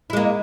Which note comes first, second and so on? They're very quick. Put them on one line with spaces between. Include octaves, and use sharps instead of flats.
E4 G#3 A#3